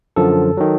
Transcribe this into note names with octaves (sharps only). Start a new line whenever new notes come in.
F#2 D3 F3 A4
D#3 F#3